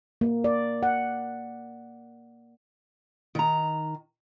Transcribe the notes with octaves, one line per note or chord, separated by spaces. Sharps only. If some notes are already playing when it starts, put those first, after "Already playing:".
A#3
D5
F#5
D#3 A#5